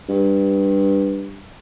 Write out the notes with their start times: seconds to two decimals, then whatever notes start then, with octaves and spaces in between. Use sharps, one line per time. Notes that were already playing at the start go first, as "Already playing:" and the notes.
0.09 G2